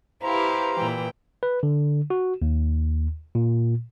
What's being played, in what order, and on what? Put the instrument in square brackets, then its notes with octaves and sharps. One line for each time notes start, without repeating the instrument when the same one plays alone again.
[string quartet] E4 [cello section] G4 B4 F5 [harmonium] C5 A#5
[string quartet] A#2 E3 G5
[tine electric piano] B4
D3
F#4
D#2
A#2